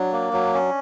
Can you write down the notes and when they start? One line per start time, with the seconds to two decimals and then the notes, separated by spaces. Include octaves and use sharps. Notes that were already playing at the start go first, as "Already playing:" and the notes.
Already playing: F#3 D4
0.12 A#3
0.33 F#3
0.54 C#4